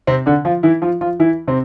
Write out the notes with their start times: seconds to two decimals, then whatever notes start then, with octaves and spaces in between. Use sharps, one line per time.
0.07 C3 C4
0.26 D3 D4
0.45 F3 F4
0.63 E3 E4
0.82 F3 F4
1.01 F3 F4
1.20 E3 E4
1.48 C3 C4